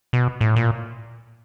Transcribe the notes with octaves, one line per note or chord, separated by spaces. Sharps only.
B2
A2
A#2